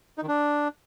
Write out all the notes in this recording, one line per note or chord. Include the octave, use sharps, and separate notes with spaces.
D#4
D#3
D4